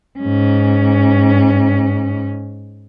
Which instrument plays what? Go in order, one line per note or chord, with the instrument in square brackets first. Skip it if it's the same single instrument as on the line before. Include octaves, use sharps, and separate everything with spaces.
[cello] G#2 C#4